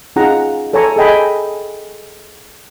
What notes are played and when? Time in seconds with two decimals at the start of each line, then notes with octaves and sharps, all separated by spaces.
0.16 C#4 D#4 F4 G#4 F#5 A#5
0.73 A4 C#5 D5 G#5 A#5 C#6
0.96 G#4 A4 D#5 G5 G#5 B5